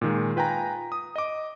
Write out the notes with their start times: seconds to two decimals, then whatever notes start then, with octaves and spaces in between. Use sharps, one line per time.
0.01 A#2 D#3 G#3
0.36 F4 B4 G5 G#5 A#5
0.92 D#6
1.16 D#5 D6